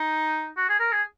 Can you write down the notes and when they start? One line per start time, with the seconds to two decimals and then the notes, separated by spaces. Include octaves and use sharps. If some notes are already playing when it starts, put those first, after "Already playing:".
Already playing: D#4
0.57 F#4
0.69 G#4
0.79 A#4
0.92 G#4